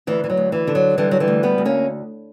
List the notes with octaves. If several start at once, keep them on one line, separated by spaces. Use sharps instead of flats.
D2 E3
E3
F#3
D2
E3
D3
F#3
D3 E3 G3
F#3
E3 G3
D2
G3 B3
D2
A#3 C#4